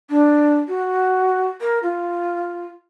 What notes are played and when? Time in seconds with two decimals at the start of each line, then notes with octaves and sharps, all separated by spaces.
0.10 D4
0.68 F#4
1.61 A#4
1.83 F4